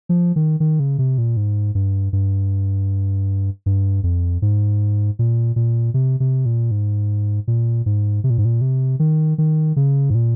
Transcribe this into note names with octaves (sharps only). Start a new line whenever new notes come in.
F3
D#3
D#3
C#3
C3
A#2
G#2
G2
G2
G2
F2
G#2
A#2
A#2
C3
C3
A#2
G#2
A#2
G#2
C3
A#2
G#2
A#2
C3
D#3
D#3
C#3
G#2
A#2